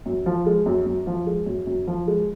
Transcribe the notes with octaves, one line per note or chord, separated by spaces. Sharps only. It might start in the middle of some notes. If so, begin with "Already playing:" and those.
F#2
F3
G#3
F#2
F#2
F3
G#3
F#2
F#2
F3
G#3